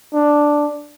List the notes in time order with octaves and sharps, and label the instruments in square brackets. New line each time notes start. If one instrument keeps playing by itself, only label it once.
[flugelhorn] D4